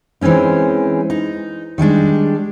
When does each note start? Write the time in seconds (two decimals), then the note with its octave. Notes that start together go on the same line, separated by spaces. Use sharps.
0.21 E3 G#3 C4 C#4 D#4
1.10 D#4
1.78 D#3 G3 G#3 D4